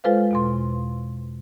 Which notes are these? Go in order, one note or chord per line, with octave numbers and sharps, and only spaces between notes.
G#3 F4 A4 B4 C5 F5
E2 B2 C6